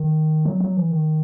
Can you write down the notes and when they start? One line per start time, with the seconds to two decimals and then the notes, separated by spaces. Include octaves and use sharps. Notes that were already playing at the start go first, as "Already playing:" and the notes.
Already playing: D#3
0.45 F#3
0.60 F#3
0.77 E3
0.92 D#3